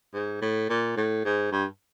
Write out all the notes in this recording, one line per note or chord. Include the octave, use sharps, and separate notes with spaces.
G#2
A2
A#2
A2
G#2
G2